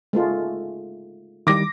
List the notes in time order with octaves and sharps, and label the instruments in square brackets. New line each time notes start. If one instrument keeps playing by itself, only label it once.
[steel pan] G#3 A3 F4
[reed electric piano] D#3 G3 [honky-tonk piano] D6 A#6